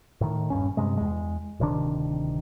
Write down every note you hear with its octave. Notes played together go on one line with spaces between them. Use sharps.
A2 D#3
D#1 G2 C#4
G2 C3 G#3
E2 G#3
D1 C3 D#3 D4